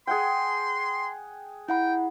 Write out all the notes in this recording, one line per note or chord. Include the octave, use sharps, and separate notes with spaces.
G#4 F#5 G5 C6
E4 F#5 G5 B5